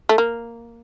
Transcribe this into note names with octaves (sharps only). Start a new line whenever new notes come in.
A3
A#3